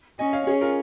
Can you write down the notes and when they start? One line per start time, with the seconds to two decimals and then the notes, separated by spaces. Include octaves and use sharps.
0.19 C#4 D#5 G#5
0.33 C#5 F5
0.47 C#4 G#4 C#5
0.61 F4 A#4